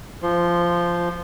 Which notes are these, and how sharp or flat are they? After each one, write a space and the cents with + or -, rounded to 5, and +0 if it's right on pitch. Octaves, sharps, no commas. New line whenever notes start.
F3 -10 C6 +0